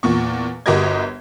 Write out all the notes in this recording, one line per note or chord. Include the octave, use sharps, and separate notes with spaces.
E2 A#2 C#6
G1 F#4 G4 A#4 D#5 G#6